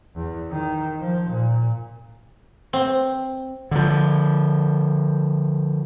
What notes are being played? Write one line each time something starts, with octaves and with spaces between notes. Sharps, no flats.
E2
D#3
F3
A#2
C4
D3 F3